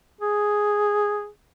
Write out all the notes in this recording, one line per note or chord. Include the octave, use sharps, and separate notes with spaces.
G#4